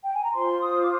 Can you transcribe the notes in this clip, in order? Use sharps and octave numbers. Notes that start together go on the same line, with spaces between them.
G5
G#5
A#5
F4 C5 C6
D#6
D6